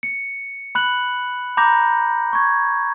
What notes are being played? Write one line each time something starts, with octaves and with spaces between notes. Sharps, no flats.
C#7
B5 F#6 F#7
A#5 B5 D6 G6 A#6
C#6 G#6